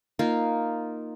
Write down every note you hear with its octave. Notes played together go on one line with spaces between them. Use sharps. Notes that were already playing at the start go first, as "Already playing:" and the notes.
A#3 D#4 F4